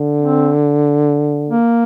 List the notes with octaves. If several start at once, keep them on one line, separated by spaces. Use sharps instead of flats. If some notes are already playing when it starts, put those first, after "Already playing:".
Already playing: D3
C4
A#3